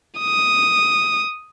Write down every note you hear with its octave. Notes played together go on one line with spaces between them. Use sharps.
D#6